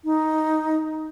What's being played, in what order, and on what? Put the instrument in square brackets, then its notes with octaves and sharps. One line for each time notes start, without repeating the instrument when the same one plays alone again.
[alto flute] D#4